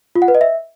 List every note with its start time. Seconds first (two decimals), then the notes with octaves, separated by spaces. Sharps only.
0.15 F4
0.22 F#5
0.28 B4
0.35 D#5
0.41 E5